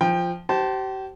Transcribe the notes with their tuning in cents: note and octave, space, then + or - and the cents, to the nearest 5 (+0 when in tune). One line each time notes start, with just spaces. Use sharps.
F3 +0 G5 +15
G4 -40 C5 +0 A5 -5